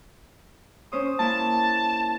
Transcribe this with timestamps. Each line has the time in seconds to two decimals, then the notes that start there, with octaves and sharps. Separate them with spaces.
0.92 C#4 C5 D#6
1.19 A#3 E4 A5